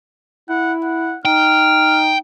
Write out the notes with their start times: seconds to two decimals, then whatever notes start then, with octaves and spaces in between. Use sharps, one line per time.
0.49 E4 F#5
0.84 F#5
1.25 D#4 G5 F6